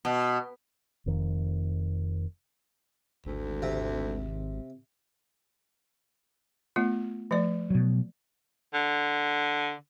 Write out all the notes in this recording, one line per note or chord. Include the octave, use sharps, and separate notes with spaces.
B2
F1 F2 D#3
G#1 D2
C3
A3 B3 F4
F3 A3 D5
B2 F#3
D3